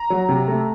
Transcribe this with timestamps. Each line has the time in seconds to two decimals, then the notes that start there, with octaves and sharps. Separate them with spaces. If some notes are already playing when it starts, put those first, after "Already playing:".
Already playing: A#5
0.10 F#3
0.29 C3
0.48 A3